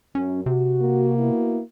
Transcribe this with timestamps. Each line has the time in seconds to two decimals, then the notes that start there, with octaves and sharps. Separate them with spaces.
0.15 F#2 C#4
0.46 C3 F#4
0.81 A#3
1.18 B3 E4 F#4